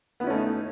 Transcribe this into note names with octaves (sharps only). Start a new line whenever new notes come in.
A3 B3 C#4 D#4 E4